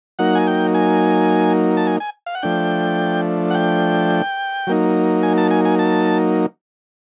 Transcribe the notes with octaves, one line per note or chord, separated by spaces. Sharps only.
F#3 A#3 D#4 F#5
G#5
G5
G#5
A5
G#5
G#5
F5
F#5
F3 A3 D4 G5
F#5
G5
F#3 A#3 D#4
G#5
A5
G#5
G#5
A5